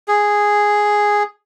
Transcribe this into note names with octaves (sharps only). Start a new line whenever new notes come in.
G#4